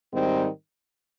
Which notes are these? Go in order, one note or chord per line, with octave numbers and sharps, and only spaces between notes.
G#2 D#3 G3 C4 D#4